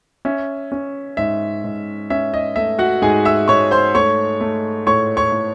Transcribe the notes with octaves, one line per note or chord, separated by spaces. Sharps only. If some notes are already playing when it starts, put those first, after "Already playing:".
C#4 E5
C#4
G#2 E5
G#2
C#4 E5
D#5
A3 E5
F#4 F#5
G#2 G#4 G#5
E5 E6
G#2 C#5 C#6
C5 C6
A3 C#5 C#6
A3
A2 C#5 C#6
C#5 C#6
A2